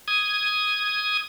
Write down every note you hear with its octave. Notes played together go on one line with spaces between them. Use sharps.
D#6 G#6